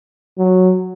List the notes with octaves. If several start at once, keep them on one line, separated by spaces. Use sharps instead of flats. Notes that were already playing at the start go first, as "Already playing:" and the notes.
F#3